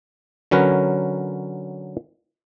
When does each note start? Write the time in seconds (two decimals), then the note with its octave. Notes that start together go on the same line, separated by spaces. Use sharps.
0.51 D3 F#3 C#4 A#4 B4